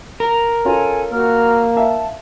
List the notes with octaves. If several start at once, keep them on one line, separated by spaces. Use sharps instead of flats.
A#4
C#4 F4 A4 G#5
A#3 F#4 E6 F6
E5 F5 A5